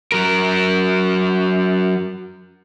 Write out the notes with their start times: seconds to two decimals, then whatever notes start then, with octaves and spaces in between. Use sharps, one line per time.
0.12 F#3 A#4